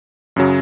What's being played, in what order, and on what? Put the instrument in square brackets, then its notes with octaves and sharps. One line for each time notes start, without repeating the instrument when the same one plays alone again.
[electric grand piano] F#2 C#3 F#3